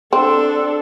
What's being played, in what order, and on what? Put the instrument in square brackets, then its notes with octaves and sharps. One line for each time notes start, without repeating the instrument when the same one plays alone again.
[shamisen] C4 [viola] D4 A4